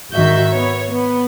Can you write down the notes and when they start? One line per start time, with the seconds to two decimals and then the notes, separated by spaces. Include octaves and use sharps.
0.14 G#1 D#3 F#4 E5 G6
0.55 B3 C#5
0.91 B3